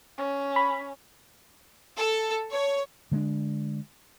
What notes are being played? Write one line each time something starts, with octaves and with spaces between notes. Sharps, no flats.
C#4
B5
A4
C#5
D3 G#3 C4 D4